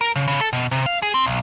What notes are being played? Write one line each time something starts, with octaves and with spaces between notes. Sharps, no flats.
A#4
C#3
C#3
A4
B2
C3
F5
G#4
C4
B1